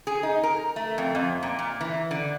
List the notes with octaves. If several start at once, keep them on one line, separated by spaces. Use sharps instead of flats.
G#4
D#4
A#4
A3
F2
F2
A#2
A#2
E3
D3